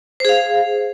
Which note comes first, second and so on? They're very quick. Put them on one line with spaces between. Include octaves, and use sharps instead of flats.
C5 G#4 F5